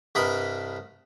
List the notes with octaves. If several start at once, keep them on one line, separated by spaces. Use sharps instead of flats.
C2 G2 A#4 D#5 B5